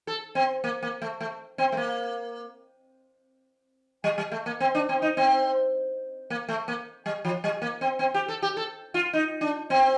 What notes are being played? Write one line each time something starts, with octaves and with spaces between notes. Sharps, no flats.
A4
C4
A#3
A#3
A3
A3
C4
A3
A#3
G3
G3
A3
A#3
C4
D4
C4
D#4
C4
A#3
A3
A#3
G3
F3
G3
A#3
C4
C4
G4
A4
G4
A4
F4
D#4
D4
C4